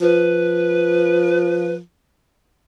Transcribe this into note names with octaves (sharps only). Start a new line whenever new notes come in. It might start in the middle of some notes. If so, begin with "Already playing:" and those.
F3 B4